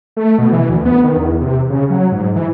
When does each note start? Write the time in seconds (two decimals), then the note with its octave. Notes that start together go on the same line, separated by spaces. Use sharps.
0.17 A3
0.38 B2
0.52 E3
0.70 D2
0.85 B3
1.04 D#3
1.17 E2
1.41 C3
1.70 C#3
1.90 F#3
2.12 G#2
2.36 E3